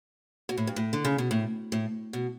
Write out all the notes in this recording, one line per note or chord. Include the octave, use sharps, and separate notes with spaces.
B2
A2
G2
A2
D3
C#3
B2
A2
A2
B2